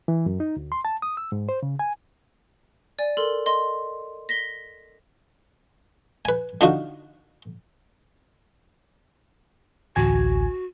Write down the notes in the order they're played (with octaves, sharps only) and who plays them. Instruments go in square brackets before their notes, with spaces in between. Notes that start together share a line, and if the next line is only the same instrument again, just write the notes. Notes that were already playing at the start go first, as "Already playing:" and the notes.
[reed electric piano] E3
F#2
D#4
D2
C6
A5
D#6
E6
G#2
C5
C#3
G#5
[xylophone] D5 G#5
A4 A#4 C6
D#5 C6
A#6 B6 G7
[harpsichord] B4 G#5
D3 D4 D#4 F4 F#4
[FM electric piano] A1 D2 G#5 [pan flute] F#4